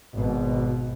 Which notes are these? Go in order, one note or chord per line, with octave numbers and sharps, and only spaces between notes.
G#1 B2